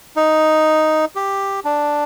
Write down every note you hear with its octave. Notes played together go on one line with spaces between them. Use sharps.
D#4
G4
D4